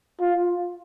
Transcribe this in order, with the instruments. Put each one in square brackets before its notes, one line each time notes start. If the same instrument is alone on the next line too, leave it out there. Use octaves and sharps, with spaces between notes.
[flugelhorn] F4